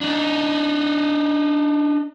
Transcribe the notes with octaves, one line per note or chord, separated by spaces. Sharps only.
D4 D#4